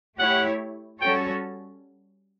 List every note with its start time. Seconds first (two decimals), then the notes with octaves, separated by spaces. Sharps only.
0.19 A3 E4 G4 C#5 F#5
1.01 G3 C#4 F#4 A4 C#5 G5